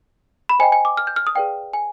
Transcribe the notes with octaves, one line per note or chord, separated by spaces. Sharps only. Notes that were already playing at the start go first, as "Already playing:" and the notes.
B5
C5 D#5 G5 G#5
G#5
D6
F6
G6
F6
D#6
G#4 B4 D5 F5 G5
G#5